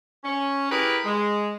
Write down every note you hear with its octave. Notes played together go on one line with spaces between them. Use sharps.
C#4
E4 G4 G#4 A#4 B4
G#3